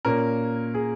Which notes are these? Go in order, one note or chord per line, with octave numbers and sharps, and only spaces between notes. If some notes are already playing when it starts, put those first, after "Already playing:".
A#2 A#3 C#4 A#4
G#4